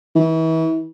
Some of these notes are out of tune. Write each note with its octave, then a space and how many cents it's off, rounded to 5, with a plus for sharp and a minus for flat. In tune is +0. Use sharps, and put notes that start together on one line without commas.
E3 -35